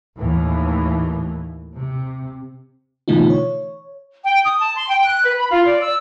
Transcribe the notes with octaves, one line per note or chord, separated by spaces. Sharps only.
D#2 A2 E3
C3
B2 D3 E3 A3 D#4 F4
C#5
G5
D#6
A5
C6
G5
F#6
B4
B5
F4
D5
E6